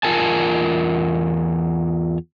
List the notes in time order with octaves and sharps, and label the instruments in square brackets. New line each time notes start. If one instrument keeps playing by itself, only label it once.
[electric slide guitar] E2 F4 A#4 G#5 A5